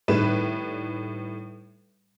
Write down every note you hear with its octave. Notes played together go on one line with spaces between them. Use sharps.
A2 D#3 G3 B4 E7